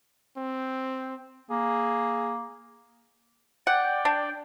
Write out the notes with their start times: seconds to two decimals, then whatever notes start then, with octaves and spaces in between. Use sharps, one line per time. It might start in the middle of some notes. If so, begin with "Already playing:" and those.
0.37 C4
1.51 A#3 G#4
3.67 D5 F#5 G5
4.05 D4